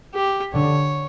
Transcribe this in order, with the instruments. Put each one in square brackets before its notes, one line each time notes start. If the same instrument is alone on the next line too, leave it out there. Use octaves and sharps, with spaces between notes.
[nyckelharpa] G4
[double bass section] D3 [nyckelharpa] C#5